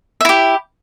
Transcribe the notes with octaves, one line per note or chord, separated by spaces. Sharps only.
E4 G4 E5